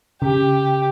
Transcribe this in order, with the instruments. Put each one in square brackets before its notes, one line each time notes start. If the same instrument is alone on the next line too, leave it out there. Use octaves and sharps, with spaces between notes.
[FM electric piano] C#3 [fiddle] G4